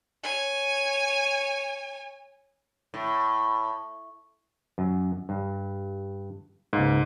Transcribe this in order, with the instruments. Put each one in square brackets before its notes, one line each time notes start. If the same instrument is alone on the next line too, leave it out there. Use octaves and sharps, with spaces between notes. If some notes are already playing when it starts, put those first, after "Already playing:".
[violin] C#5 G#5
[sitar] A2
[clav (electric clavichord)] F#2
G2
[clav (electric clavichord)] C#2 A#3 [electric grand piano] G#2